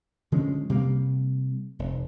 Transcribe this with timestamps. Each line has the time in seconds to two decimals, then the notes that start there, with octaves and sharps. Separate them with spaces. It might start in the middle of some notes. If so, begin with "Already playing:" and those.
0.32 D3 F3 G#3 C#4
0.70 C3 G3 A#3
1.79 F1